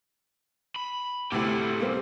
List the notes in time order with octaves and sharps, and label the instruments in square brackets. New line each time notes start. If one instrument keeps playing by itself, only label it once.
[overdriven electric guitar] B5
[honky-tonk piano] D2 A2 C3 [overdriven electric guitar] G4 A4
[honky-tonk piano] G3 A#3 C4